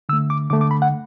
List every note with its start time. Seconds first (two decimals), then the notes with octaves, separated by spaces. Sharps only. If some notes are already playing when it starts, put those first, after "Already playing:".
0.09 D3 E6
0.13 A3
0.30 D6
0.50 D3 A3 D6
0.61 D6
0.71 B5
0.82 F#5